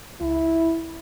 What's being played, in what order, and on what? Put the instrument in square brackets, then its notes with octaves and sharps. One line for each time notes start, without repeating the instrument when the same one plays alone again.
[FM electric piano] C#2 [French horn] E4